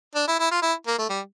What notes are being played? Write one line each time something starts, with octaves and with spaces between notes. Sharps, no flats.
D4
E4
E4
F4
E4
A#3
A3
G3